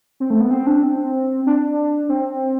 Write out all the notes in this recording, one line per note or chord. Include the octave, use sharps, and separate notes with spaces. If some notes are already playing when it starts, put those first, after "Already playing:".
C4
A3
B3
C4
D4
C4
D4
C4